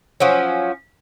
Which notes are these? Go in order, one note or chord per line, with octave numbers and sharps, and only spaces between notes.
F3 F#3 C#4